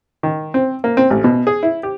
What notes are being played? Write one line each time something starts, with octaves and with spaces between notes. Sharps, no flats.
D#3
C4
A#3
C4
A1
B2
G#4
E4
G4